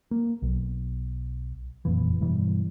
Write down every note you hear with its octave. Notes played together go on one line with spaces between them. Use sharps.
A#3
B1
F#1 F2 A#2 E3
G2 B2 E3 G3